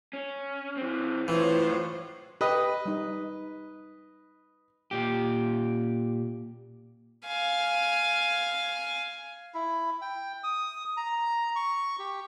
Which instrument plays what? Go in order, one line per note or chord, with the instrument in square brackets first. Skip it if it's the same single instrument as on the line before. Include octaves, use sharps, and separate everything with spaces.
[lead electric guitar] C#4
E3 C4
[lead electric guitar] B1 A2 [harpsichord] E3 [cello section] F4 C5 C#5
[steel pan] G4 [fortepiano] B4 D#5
[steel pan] G3 D#4
[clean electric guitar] A#2 G4
[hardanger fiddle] F5 G#5
[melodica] E4
G5
D#6
A#5
C#6
G4